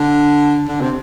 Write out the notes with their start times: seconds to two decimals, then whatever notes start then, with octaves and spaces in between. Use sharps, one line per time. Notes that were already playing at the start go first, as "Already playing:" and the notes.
Already playing: D3
0.68 D3
0.81 C3